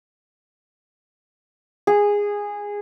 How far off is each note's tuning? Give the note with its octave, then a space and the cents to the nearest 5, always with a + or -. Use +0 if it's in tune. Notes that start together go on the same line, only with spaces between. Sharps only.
G#4 -15